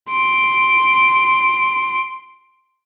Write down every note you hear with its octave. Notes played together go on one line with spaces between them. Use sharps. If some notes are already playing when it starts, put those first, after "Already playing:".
C6 D7